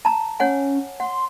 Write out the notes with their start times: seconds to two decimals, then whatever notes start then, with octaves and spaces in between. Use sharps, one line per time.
0.05 A5 A#5
0.40 C#4 C#5 F#5 G#5
1.00 F#5 C6